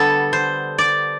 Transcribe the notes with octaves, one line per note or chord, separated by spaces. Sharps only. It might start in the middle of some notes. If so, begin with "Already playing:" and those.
Already playing: D3 G3 B3 A4
C5
D5